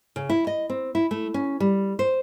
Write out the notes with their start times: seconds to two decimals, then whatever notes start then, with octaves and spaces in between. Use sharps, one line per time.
0.16 C#3
0.29 E4
0.47 D#5
0.69 C4
0.95 E4
1.11 A3
1.34 C#4
1.60 G3
1.99 C5